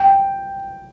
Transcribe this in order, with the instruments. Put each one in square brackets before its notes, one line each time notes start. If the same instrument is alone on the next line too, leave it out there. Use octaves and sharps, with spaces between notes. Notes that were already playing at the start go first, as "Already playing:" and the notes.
Already playing: [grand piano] G5